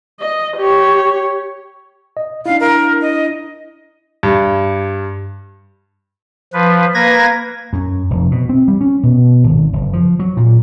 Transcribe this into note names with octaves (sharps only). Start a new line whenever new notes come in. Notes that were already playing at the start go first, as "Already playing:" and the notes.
D#5
G4 C#5
D#5
D4 E4 F5
A#4
D#5
G2
F3 B4
A#3 B4 G#6 A#6
F#2
F1
B2
C4
G3
C#4
B2
G#1
F#1
F3
F#3
A#2